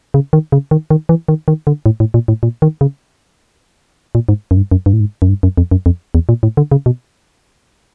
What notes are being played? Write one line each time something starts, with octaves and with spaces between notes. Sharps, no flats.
C#3
D#3
C#3
D#3
D#3
E3
D#3
D#3
D3
A2
A2
A#2
A2
A#2
D#3
C#3
A#2
G#2
F#2
G2
F#2
G2
A2
G#2
F#2
G2
F#2
F2
F#2
F2
E2
A#2
A2
D3
C#3
B2